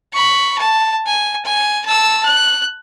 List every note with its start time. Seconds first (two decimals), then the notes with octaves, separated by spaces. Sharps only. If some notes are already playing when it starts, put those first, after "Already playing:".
0.13 B5 C#6
0.58 A5
1.06 G#5
1.45 G#5
1.85 A5 E6
2.25 F#6